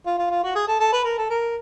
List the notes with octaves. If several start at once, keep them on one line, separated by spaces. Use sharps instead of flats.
F4
F4
F4
F#4
G#4
A4
A4
B4
A#4
A4
A#4